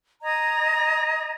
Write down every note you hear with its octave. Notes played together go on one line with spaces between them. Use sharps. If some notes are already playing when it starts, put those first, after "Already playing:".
D#5 A#5 G#6